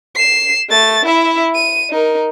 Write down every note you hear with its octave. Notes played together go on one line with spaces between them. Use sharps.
C7 E7
A3 A6
E4 E5
D#7
D#4 A#4